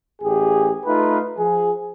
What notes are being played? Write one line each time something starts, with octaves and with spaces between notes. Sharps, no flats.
A1 G4 G#4
A3 D#4 F4 B4
F3 G#4